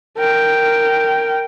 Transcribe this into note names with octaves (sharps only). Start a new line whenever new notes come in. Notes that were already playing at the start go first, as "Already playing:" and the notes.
A#4 G5